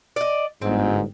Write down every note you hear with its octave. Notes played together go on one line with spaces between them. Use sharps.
D5 D#5
G1 G#2 C4